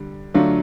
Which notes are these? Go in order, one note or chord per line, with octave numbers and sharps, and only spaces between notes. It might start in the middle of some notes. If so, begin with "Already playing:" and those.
Already playing: D3 G3
D3 F#3 A3 D4 F4